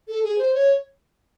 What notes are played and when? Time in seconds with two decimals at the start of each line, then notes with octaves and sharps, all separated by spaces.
0.08 A4
0.24 G#4
0.38 C5
0.54 C#5